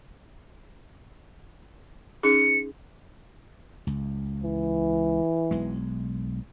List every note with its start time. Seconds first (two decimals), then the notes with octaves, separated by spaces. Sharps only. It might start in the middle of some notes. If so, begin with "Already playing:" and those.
2.23 C#4 D#4 G#4 C#7
3.87 C#2
4.44 E3
5.51 B1 G#3